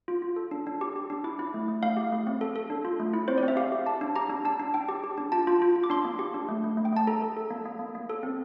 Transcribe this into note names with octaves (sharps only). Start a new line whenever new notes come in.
F4
F4
A4
D4
D4
G4
G4
D4
E4 D6
E4
A3
A3
A3 F5
G4
A3
C4
A4
A4
D4
F4
A3
E4
C4 C5
D5
C4
E5
G4 F5
G4
G4 A5
D4
G4 A#5
D4
D4 A5
D4
D4 G5
G4
G4
D4
F4 A5
F4
F4
F4
D6
D4 C6
A#3
G4
D4
A3
A3
A3
G5
A3 A5
A4 A#5
A4
A4
A#3
A#3
A#3
A#3
A4
C4